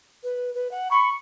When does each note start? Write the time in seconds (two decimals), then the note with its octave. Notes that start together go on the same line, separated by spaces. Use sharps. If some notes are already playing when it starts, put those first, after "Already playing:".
0.24 B4
0.55 B4
0.71 F#5
0.91 B5 C#6